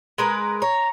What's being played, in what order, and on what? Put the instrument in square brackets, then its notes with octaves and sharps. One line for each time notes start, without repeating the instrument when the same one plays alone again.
[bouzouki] G#3 A#4 B4
[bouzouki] C#5 [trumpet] A#5